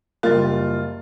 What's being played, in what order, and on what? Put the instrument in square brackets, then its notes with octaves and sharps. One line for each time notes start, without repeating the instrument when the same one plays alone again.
[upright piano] F#1 G3 A6 [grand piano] F4 [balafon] A#4